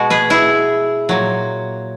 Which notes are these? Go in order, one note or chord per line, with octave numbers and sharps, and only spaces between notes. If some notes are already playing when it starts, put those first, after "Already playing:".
Already playing: B2 G#3 F#4
G#4 B4
E4 G#4
A#2 F#3